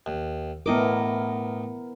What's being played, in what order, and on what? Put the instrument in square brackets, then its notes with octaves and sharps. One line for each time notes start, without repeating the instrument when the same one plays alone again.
[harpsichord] D#2
[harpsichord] A2 D#5 D6 [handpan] B3 E4 A#4